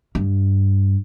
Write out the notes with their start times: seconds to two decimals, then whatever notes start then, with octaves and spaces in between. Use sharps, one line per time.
0.15 G2